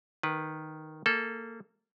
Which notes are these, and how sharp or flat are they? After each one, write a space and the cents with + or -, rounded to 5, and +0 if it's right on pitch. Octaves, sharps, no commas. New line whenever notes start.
D#3 +0 B4 -10
A#3 -25 A4 -15